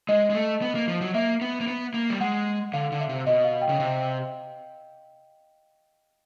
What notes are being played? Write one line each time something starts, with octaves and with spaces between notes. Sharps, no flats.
G#3 D#5
G#3
A3
B3
A#3
F3
F#3
A#3 E5
B3
A#3
B3
A#3
G3
G#3 F#5
D3 F5
D3
E5
C3
B2 D#5
F5
G5
C#3
C3